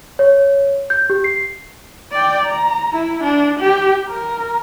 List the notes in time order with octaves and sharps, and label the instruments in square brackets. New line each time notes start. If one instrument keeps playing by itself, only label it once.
[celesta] C#5
G6
G4
C7
[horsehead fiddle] D5 G5
A#5
E4
D4
G4
A#4